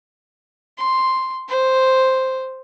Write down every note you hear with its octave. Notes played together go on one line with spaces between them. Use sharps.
C6
C5